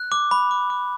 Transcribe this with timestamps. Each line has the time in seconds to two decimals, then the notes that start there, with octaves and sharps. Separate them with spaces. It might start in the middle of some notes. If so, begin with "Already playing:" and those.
Already playing: F#6
0.12 D6
0.31 B5
0.51 D6
0.70 D6